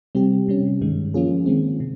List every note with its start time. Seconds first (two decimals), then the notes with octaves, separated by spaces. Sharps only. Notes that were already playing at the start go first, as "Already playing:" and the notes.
0.15 C3 G3 C4 G4
0.48 C3 G3 C#4
0.81 G2 D#3 G#3
1.14 F3 A#3 C#4 F4 G#4
1.46 D#3 G#3 C4
1.80 C3